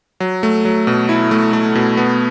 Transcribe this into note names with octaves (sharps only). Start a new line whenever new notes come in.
F#3
A3
F#3
B2
E4
A3
A3
B2
B3